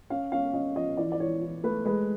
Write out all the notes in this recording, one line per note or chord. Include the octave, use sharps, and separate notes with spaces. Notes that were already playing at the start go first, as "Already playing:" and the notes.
C#4 F5
C#4 F5
C#4 D#5
F3 D#5
E3 D5
D5
E3 C#5
E3
A3 B4
G#3 B4